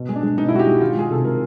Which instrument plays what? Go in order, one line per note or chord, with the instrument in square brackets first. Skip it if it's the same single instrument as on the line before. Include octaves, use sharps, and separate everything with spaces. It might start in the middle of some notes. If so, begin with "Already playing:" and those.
Already playing: [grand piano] B2
G#3
D4
G#3
B2 D#4
E4
G#3 F#4
G4
G#3
D#3 F4
G#3 G#4
C3 A4
G#3 A#4